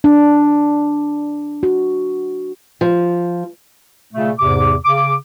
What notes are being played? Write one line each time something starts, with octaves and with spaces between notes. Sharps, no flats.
D4
F#4
F3
A#2 C#3 A3
E2 G#2 C3 D6
C#3 D6